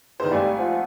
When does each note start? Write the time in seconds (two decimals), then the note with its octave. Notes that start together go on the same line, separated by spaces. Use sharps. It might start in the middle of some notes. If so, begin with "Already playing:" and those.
0.20 E2 D#3 D#4 C5
0.31 G#1 G3 A3 G#5
0.59 F3 F#5